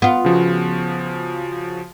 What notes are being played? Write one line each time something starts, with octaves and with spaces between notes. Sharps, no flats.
B3 F4
C#3 F3 F#4